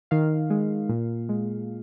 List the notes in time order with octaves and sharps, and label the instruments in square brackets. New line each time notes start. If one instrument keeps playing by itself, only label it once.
[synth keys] D#3 F5
G#3
A#2
G#3